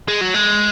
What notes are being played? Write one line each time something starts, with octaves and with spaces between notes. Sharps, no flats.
G#3
F#3
G#3